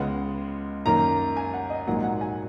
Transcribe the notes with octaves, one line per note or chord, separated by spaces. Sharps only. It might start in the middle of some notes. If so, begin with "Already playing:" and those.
Already playing: C#2 C#3 G#3 B3 F#5
F#2 D#3 A#3 A#5
G#5
F#5
D#5
A#1 G#2 F#3 A#3 F#5
F#5
G#5